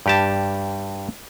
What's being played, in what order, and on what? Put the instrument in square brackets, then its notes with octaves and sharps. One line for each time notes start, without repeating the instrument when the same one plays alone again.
[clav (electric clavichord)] G2 G4 A5